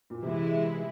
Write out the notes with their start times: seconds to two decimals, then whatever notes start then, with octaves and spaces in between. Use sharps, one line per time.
0.10 A#2
0.22 C3 E3 G#3 E4